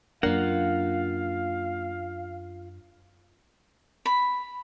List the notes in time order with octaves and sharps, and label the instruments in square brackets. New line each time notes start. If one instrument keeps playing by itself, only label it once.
[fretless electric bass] F#2 D4 [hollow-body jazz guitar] A#3 [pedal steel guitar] F4 F#5 [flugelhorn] F5
[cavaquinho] B5